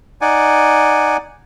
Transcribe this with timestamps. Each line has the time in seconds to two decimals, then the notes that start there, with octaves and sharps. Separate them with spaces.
0.21 D#4 D5 F#5 G#5